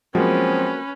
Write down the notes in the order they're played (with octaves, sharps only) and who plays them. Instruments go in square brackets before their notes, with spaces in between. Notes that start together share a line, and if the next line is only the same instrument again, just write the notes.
[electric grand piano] F3 F#3 G#3 [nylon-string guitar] A#3 F#4 [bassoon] C4 [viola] C#4 B4